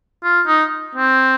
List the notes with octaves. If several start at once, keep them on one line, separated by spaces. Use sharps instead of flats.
F4
D#4
C4